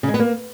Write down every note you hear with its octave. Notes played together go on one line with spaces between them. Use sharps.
C#3
G#3
B3
A#3